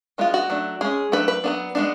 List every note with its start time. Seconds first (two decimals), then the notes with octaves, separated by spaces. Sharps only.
0.18 F3 G#3 B3 D4 F4
0.34 F#4
0.50 F#3 A3 D4
0.81 G#3 C#4 G#4
1.12 F#3 A3 D4 B4
1.28 B4
1.44 F#3 B3 D4
1.75 G#3 B3 D4